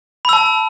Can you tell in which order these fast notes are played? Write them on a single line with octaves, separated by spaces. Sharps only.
B5 E6 A5